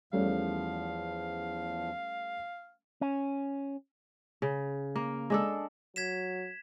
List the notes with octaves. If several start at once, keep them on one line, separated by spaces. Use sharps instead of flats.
E2 F3 G3 A3 C#4 F5
C#4
C#3
A#3
G#3 D4 A4
F#3 G#6 B6 E7